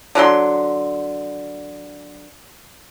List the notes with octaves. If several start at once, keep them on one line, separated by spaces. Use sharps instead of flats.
D3 F#3 G#4 C6